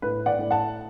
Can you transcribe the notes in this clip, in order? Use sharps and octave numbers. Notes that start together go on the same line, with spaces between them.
A2 B4
D5 F#5
A2
F#5 A5